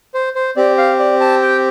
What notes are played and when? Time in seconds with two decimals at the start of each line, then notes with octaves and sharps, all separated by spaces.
0.14 C5
0.36 C5
0.56 C4 G4 D5
0.78 F5
0.99 D5
1.20 A5
1.42 G5